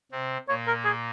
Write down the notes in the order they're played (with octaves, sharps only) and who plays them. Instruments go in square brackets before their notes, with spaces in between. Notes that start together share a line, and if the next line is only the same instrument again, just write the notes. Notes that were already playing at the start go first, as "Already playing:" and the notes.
[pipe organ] C3 C4
[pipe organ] A#2 A#3 [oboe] C#5
[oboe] A#4
G#4